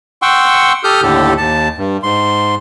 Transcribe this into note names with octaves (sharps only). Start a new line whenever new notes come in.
F#5 G5 C6 C#6 E6
G4 A4 D#6 F6 G6
D#2 A2 D3 G4 A4
D#2 A5
G2
G#2 C6